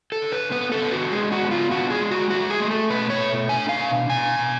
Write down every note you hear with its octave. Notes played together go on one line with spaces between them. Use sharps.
A4
D3
B4
B3 B4
A4
D4
F#4
G#3 G#4
F#4
B3
F4
D4 F#4
G#4
G#3
F#4
A3 F#4
G#4
A3
A4
B2 B4
C#5
A3
D4 G#5
F5
B2
B2 G#5
B2